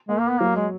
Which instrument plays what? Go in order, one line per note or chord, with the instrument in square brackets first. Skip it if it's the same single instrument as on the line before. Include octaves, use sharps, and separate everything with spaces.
[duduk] G#3 [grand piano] A#3
[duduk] A#3
B3
[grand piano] F#3 [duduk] A#3
[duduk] G#3